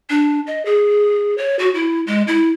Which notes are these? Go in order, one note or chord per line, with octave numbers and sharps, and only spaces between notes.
D4
D#5
G#4
C#5
F#4
E4
G#3
E4